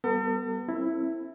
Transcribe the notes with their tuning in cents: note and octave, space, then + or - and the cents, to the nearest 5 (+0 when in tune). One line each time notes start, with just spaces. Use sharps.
G3 -20 B3 +0 A4 +45
C4 +35 E4 +0